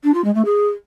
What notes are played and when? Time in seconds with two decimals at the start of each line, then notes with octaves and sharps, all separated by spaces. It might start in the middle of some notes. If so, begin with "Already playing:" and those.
0.04 D4
0.14 F4
0.24 G#3
0.35 A3
0.45 G#4